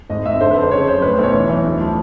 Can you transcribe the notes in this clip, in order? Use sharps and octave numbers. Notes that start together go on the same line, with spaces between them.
G#1 D#5
G#1 E5
D3 C5
B4
F2
C5
C#3 C#5
F#2 C5
A2 B4
C5
B1 C#5
E3 C#5
E3
D2
F3